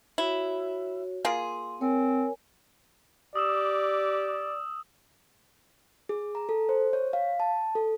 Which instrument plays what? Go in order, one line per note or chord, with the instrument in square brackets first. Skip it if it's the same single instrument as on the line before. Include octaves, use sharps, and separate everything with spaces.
[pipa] E4 [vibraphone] F#4 C#5
[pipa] A#3 F4 G#4 [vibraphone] C6
[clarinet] C4 [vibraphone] A#4 C#5 G#5
[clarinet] G4 [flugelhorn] D5 [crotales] D#6 E6 E7
[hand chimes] G#4
A#5
A4
C5
C#5
F5
A5
A4